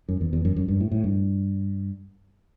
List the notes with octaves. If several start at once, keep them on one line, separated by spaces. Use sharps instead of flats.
F#2
E2
E2
F#2
F#2
G2
A2
A2
G2